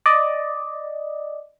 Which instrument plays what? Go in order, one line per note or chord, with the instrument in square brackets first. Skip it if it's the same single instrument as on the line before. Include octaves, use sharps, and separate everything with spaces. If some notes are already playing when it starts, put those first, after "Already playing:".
[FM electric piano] D5 D#5